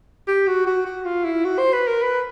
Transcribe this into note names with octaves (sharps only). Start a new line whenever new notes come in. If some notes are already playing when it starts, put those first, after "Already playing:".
G4
F#4
F#4
F#4
F4
E4
F#4
C5
B4
A#4
B4